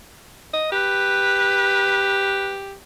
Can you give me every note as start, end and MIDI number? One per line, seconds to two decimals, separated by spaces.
0.54 0.67 75
0.72 2.74 67
0.72 2.56 71